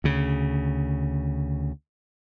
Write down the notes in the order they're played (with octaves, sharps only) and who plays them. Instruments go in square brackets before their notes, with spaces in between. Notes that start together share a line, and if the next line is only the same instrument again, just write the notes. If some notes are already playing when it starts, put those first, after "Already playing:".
[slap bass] D2 C#3